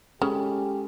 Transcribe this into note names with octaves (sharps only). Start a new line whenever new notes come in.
C#3 G#3 C#4 G4 A4